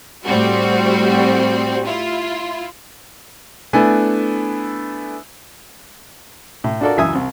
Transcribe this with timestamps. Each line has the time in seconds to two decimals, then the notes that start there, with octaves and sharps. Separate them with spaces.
0.25 A2 G3 C4 F#4
1.85 E4 F4
3.73 A3 B3 D4 E4 G#5
6.64 A2
6.81 D4 F4 F#4 A4 A#4 D5
6.97 C#2 F#2 E3 E5 G#5 D#6
7.15 C2